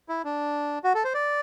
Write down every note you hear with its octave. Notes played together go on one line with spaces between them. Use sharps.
E4
D4
F#4
A4
C5
D5